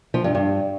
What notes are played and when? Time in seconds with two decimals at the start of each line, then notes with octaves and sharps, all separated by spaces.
0.14 F3
0.24 G2
0.35 G2